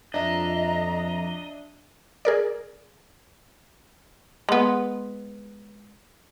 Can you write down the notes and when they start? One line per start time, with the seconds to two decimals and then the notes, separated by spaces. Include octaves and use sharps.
0.14 F2 D4 D#5 E5 A#5
2.25 G#4 A#4 D5
4.49 G#3 B3